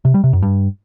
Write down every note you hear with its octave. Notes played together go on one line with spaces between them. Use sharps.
C3
G3
C3
F#2
G2